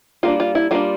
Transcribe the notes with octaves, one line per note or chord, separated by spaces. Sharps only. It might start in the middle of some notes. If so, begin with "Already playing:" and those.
G3 A#3 D4 F4
F4
E4
G3 A#3 D4 F4